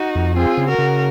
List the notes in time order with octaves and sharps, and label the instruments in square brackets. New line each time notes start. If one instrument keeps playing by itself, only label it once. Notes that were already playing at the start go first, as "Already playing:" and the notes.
Already playing: [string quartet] D#4 F#4
[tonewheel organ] F2
[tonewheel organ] C4 [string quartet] F4 G#4
[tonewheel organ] C#3
[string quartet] F#4 A#4
[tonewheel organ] C#3